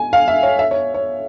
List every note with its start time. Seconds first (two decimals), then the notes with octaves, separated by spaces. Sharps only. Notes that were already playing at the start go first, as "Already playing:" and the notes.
Already playing: G#5
0.13 F5
0.28 E5
0.43 C#5
0.59 E5
0.71 C#5
0.94 C#5